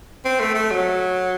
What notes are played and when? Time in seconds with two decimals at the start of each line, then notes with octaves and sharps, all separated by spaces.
0.25 C4
0.40 A3
0.55 A3
0.71 F#3